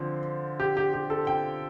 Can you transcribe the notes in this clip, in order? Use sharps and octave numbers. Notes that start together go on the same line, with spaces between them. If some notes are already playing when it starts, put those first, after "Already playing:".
Already playing: D3 F3 C4
G4
G4
G4
A4
G5